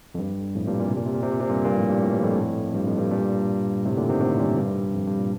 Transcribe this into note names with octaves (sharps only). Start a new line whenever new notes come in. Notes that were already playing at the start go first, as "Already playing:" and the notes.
F2
G2
F2 A2
G2 A#2
A#2
C3
A#2
C3
A#2
C3
A#2
C3
G2 A#2
G2 A#2
F2 A2
G2
A2
G2
F2 A2
G2
F2
G2
G2 A#2
A2 C3
A#2 D3
C3 D#3
A2 C3
G2 A#2
G2
F2
G2
A#2